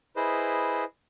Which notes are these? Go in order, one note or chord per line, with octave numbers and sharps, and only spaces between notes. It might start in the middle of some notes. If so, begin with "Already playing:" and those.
E4 G#4 B4 C5 D#5